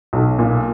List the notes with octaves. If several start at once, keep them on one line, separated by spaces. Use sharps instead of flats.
B1
A#2